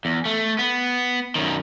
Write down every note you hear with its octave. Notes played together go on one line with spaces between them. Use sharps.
E2
A3
B3
F#2 D#3